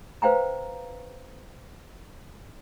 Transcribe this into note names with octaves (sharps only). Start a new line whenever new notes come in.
B4 C5 F5 G5 A#5